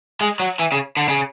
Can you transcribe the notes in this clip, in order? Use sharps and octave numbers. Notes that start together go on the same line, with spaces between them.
G#3
F#3
E3
C#3
D3
C#3